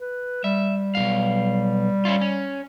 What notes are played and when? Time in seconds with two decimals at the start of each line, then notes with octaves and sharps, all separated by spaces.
0.01 B4
0.44 G3 E5
0.95 B1 F#2 F5
2.05 C#4 E4 F4
2.21 C#4